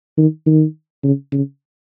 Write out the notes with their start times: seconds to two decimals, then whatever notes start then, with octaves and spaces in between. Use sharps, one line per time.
0.18 D#3
0.46 D#3
1.04 C#3
1.32 C#3